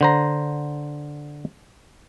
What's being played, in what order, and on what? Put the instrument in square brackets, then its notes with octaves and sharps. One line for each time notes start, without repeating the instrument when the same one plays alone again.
[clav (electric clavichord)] D3 C5 A#5